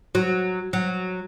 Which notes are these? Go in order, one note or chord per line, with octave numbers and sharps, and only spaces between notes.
F#3
F#3